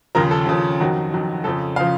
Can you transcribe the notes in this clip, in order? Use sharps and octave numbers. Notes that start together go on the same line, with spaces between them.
D#2 C#3 F3 A#4
A4
D#2 C#3 F3
F2 D#3 F#3 F#4
F2 D#3 F#3
F2 C#3 F3 A4
C#3 F3 F5